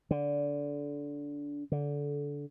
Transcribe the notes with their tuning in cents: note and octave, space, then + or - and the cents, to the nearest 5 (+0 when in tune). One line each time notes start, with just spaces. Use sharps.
D3 -20
D3 -20